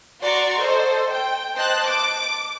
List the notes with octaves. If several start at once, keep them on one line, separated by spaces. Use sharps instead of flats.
F#4 D5 A#5 C6 C#6
A4 C5 D#5
G5
C5 D#5 A5 F#6
D6